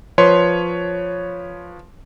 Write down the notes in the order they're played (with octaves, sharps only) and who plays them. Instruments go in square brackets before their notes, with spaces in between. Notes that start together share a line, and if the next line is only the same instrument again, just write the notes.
[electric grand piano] F3 B4 C#5 C6